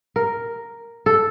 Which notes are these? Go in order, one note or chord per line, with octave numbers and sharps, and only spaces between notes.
A#4
A4